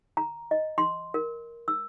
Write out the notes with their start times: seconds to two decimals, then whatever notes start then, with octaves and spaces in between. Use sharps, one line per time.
0.17 A#5
0.51 D#5
0.78 C6
1.14 A#4
1.68 E6